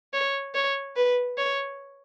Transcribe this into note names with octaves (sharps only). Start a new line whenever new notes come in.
C#5
C#5
B4
C#5